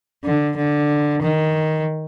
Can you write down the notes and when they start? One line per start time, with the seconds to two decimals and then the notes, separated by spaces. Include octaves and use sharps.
0.24 D3
0.57 D3
1.22 D#3